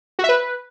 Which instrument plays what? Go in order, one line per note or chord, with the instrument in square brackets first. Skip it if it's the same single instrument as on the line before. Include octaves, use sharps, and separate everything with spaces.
[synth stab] F#4
E5
B4